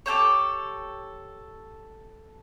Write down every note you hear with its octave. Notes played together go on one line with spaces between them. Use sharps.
G4 A4 C5 C#5